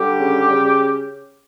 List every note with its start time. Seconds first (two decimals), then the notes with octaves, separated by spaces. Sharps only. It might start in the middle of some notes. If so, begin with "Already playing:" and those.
Already playing: D3 G3 G4
0.19 C#3
0.49 C#3